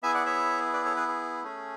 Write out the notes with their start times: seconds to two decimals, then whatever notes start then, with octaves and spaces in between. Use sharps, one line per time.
0.03 B3 E4 G#4 E5 G#5
0.14 D5 F#5
0.26 C#5 E5
0.73 B4 D5
0.85 A4 C#5
0.96 G#4 B4
1.08 G#4
1.43 A3 C#4 G#4